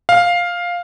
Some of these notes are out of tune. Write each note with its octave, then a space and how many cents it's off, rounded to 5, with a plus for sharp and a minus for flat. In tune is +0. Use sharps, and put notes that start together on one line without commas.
F5 +5